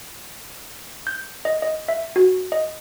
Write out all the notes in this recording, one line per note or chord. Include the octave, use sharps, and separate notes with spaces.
G6
D#5
D#5
E5
F#4
D#5